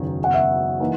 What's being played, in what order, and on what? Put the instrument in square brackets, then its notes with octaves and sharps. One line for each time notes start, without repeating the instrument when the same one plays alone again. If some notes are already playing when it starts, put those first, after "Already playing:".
Already playing: [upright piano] F#1 E2 D#3 F#3 C#4
[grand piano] F#5
E5
[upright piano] E3 A#3 D#4